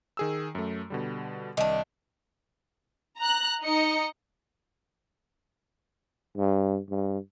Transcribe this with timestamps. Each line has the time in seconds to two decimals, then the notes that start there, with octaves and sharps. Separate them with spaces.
0.17 D#3 G#4 E6
0.55 F#2 A3
0.90 B2 D3 G3
1.57 C2 D#3 D4
3.19 A#5 F#6
3.64 D#4 D#5 C#7
6.37 G2
6.90 G2